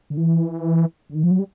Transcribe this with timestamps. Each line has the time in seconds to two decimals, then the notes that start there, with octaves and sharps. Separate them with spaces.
0.10 D3
0.17 E3
1.10 D3
1.15 D#3
1.24 F3
1.31 F#3
1.39 G3